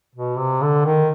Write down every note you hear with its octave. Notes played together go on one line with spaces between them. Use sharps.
B2
C3
D3
D#3